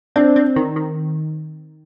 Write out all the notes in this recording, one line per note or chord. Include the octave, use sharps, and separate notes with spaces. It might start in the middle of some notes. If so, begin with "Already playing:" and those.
C4 D4
C4
D#3
D#3